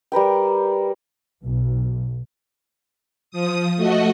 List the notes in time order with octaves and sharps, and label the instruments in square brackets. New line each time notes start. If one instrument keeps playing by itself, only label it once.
[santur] G3 A#4 B4 G5
[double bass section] B1
[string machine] F3 D#6
A3 F#4 D#5